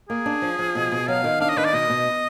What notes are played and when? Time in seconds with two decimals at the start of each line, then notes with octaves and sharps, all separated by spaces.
0.09 A#3 G#4
0.26 D4
0.42 F3
0.59 F3
0.75 B2
0.92 B2
1.08 F#3 F5
1.24 D#3
1.40 D4 F5
1.49 D#5
1.57 D#3 B4
1.65 D5
1.73 B2 D#5
1.90 B2